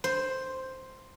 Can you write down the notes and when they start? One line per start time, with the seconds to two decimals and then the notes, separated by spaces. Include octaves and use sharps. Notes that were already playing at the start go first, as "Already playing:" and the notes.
0.04 C5